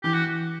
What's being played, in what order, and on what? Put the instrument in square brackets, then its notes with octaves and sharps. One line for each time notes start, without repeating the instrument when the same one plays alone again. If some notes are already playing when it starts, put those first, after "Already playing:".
[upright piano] E3 [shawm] G4
[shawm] F#4